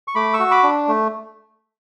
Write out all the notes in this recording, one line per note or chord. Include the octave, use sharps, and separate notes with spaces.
C#6
A3 B5 D6
C#6 E6
F#4
B5 D6
D4
A3